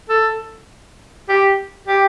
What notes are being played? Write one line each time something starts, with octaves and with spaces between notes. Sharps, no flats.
A4
G4
G4